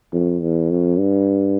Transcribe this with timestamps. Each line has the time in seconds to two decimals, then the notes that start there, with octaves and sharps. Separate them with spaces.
0.13 F2
0.41 E2
0.70 F2
0.99 G2